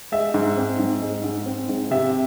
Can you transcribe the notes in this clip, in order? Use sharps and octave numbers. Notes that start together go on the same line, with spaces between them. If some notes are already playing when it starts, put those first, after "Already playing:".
G#3 E5
G#2
C4
G#2
G#3
G#2
C4
G#2
C3 E5